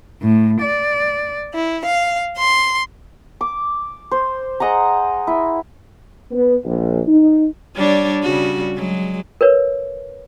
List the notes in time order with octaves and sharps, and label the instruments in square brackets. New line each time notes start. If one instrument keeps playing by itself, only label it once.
[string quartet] A2
D5
E4
F5
C6
[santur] D6
C5
G#4 D#5 F#5 A#5
E4
[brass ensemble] B3
A#1
D#4
[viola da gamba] G3 D4 C#5
C#3 G3 F#4
F#3 G#3
[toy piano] A#4 B4 C#5